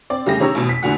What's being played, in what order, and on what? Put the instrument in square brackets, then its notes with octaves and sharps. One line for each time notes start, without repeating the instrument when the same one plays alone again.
[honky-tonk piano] C4 D5
C#3 G3 A3 G4 G#4 A#6
D#3 C#4 G4 C#5 A#5 E6
A1 B2
B6
A1 E2 A#2 D3 F#4 F#5